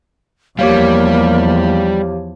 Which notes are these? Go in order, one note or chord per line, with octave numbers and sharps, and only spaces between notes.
E2 F3 G3 A#3 G4 C#5 F5